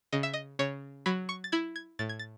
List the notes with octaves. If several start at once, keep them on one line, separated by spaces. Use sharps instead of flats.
C#3 D#5
E5
D#5
C#3 C#5
F#3 B5
C#6
A6
E4 G#6
G#6
A2 A6
G#6
A6